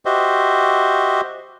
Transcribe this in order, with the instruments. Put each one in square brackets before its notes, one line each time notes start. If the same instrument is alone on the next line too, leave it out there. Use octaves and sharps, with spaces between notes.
[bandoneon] F#4 G4 C5 D#5 E5